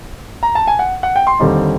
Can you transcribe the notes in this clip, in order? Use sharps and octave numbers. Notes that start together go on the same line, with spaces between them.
A#5
A5
G#5
F#5
F#5
G5
C6
D#2 D3 G3 C4 D#4